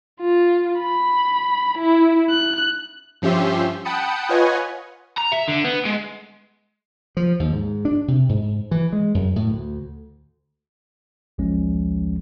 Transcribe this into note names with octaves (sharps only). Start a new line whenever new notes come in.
F4
B5
E4
F#6
G2 F3 C#4 G4 E5 C6
F#5 G5 A5 B5 D#6 C#7
F4 B4 C#5 D#5 F#5 G#5
A#5
E5
D3
B3
G#3
F3
D#2
G#2
D4
C3
G#2
E3
G#3
F#2
A2
D2
A1 D2 F3 G#3 C#4